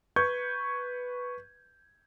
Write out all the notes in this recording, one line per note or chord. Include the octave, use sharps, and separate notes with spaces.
B4 C#6 G6 G#6